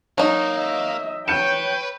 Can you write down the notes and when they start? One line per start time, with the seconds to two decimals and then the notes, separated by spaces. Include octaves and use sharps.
0.18 F#3 A#3 D#4
0.55 D#5 E5
1.28 B4 C#5 G5 G6 C#7 E7